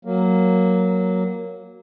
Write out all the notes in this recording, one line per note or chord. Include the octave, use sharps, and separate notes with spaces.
F#3 A#3